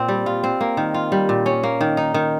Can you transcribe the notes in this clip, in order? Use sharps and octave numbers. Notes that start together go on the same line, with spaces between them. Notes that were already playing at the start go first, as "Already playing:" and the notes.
Already playing: A#2 C4
G3
F4
C4
A#3
D#3
F4
G3
A#2
C#4
A#3
D#3
D#4
D#3